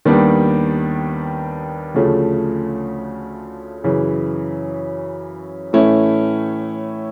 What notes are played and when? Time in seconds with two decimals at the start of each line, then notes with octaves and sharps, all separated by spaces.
0.05 D#2 D#3 G3 B3 D4
1.94 D2 C#3 F3 A3
3.84 F#2 C#3 E3
5.73 A2 E3 A3 C#4 E4